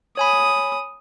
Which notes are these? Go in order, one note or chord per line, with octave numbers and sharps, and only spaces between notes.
C#5 G#5 B5 D#6